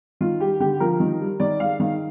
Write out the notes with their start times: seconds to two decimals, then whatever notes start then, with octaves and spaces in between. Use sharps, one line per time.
0.21 D#3 F4
0.40 G3 G4
0.60 D3 G4
0.80 F3 A#4
1.00 D#3
1.20 G3
1.40 D#3 D5
1.60 G#3 F5
1.80 D#3 F5